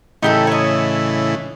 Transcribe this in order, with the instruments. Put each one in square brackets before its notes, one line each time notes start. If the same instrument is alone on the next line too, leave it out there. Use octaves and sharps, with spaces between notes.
[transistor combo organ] A2 C#3 E3 [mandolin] D#4 G4 A4
[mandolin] C#5 D#5